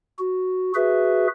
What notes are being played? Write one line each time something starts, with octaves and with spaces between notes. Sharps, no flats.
F#4
F#4 G#4 B4 E5